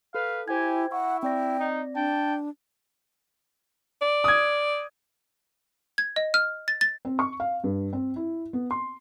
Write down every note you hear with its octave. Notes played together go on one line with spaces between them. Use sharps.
A4 B4 F5
E4 G4 C5 G5 G#5 G#6
E4 F#5 C#6
C4 D5 G5 A#6
D#4
D4 G5 A5
D5
D#6 G#6
G#6
D#5
F6
A6
A6
C4
C#6
F5
G2
C4
E4
B3
C6